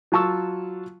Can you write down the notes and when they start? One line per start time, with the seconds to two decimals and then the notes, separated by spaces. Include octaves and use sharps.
0.12 F#3 F4 A5 C#6 E6